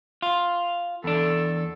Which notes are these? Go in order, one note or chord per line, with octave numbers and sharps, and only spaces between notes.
F4
E2 D4 A4